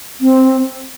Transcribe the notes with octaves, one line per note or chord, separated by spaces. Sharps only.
C4